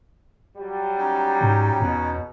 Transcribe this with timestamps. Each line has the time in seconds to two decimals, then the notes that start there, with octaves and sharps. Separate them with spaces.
0.57 F#3 G3
0.97 C#4 D#4
1.41 G#2
1.80 E2 B2